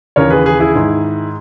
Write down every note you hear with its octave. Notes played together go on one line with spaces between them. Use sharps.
D#2 C#3 E3 A#4 C#5
G#4 B4
G#4 B4
E4 G#4
G#2 D#3